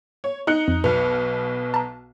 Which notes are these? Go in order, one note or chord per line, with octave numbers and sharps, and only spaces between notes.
C#5
D#4 F#6 C#7
F2
B1 B2 B4
A5 A#5